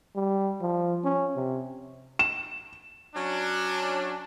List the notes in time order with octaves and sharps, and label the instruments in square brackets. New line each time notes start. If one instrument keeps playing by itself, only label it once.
[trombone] G3
F3
C#4
C3
[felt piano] E7
[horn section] F#3 C#4 D4